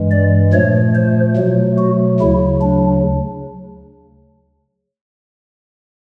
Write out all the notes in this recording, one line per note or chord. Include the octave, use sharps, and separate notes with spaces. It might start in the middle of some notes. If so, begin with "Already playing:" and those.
Already playing: G2 E3 G#3
D5
A#2 F3 A3 C#5
C5
B2 F#3 A3
F#4
D2 C#3 F#3 E4
D4